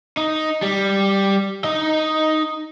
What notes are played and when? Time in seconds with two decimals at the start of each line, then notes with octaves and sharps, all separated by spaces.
0.17 D#4
0.62 G3
1.64 D#4 D#5